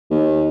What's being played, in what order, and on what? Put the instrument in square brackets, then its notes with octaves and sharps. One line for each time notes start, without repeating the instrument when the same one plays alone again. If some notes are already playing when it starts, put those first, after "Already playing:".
[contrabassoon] D#2